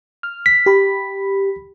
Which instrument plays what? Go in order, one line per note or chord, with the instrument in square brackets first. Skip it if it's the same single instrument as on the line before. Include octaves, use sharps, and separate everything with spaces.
[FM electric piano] F6
[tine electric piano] B6
[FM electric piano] G4 B5